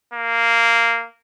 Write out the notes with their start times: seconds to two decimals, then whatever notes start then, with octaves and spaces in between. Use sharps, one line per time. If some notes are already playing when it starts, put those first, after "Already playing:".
0.13 A#3